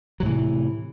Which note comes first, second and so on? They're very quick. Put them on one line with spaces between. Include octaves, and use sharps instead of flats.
F#3 A2 E3 C3